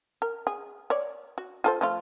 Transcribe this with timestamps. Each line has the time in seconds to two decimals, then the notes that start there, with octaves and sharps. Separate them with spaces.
0.22 A#4
0.47 G#4
0.90 C#5 D5
1.38 F#4
1.64 F4 A4 C5
1.81 F3 A3 F4